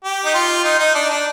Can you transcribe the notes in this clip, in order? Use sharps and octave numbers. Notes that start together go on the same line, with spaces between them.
G4
D#4
F4
D#4
D#4
D4
D4